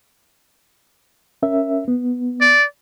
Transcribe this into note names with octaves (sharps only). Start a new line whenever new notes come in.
C#4 A#4 E5
B3
D5